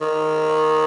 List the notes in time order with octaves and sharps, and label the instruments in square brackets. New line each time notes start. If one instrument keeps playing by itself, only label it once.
[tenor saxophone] D#3